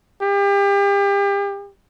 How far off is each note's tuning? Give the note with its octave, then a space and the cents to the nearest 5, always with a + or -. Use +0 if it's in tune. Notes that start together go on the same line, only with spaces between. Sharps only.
G4 +35